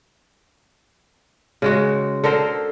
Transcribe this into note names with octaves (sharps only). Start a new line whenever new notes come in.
C#3 G#3 F#4
D3 A4 A#4 C5